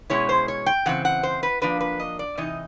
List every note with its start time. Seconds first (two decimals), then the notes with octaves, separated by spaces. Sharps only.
0.10 B2 G#3 C#4 E4 C#5
0.29 C5
0.48 C#5
0.66 G5
0.86 C#3 E3 C4 F#5
1.05 F#5
1.23 C5
1.43 B4
1.62 F3 A#3 D4 B4
1.81 B4
2.00 D#5
2.19 D5
2.38 C3 E3 D#4 D#5